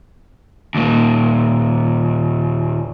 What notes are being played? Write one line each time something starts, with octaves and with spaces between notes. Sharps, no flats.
D#2 A#2